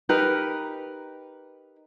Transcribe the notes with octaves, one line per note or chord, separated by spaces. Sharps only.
D#4 G4 A#4 B4